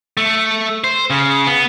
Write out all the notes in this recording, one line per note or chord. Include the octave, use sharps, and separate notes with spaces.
A3
C5
C#3
B3